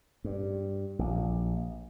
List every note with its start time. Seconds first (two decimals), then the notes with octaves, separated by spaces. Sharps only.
0.24 G2
0.99 A#1